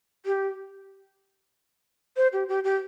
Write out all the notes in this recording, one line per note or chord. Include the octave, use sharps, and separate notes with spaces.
G4
C5
G4
G4
G4